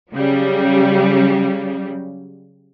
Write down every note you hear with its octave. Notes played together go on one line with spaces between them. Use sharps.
C#3 F#3 G3